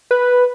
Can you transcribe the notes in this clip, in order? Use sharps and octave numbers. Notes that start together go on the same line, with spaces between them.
B4